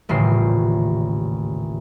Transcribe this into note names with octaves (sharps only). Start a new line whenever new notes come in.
D#1 A1 C#3 C7